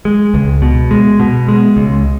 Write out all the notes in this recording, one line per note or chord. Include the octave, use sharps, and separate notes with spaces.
G#3
C#2
B2
G#3
B2
G#3
C#2